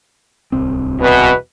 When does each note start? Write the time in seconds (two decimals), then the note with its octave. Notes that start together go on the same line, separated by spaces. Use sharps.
0.52 D1 C2 C4
1.00 E2 B2 B4